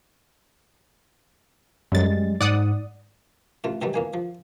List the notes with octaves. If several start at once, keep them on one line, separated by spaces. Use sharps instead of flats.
F#2 G3 G#3 A6
G#2 D5 F#5 D#6
A1 A3 F4
A2 D#3 E3 F#3 G3 A3
E2 A#3 G#5
F3